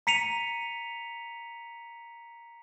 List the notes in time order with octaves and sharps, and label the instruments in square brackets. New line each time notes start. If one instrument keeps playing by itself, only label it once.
[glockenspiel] A#5 B6 C#7 D#7 F7